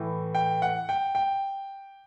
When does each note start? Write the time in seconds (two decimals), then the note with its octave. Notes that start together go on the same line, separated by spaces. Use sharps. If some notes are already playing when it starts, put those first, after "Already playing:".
Already playing: A2 E3
0.35 G5
0.62 F#5
0.89 G5
1.15 G5